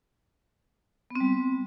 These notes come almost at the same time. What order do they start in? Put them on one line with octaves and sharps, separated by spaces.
B3 C4 G3